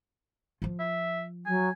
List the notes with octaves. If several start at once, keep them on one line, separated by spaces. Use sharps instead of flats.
F3 F4
E5
F#3 G#5